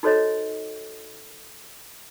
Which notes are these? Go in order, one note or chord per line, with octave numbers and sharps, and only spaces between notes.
D#4 F#4 A4 C5 C#5 D#5